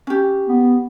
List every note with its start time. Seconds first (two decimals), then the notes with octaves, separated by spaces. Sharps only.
0.07 C#4 G4
0.48 B3